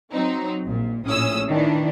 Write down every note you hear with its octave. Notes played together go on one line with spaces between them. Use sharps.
F#3 C4 D#4
A#1 A#2
A#1 A2 C#4 D#6 E6
D#3 E3 D4